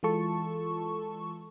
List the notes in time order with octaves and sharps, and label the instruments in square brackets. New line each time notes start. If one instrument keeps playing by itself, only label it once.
[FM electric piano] E3 G#3 F4 A4 A5 C#6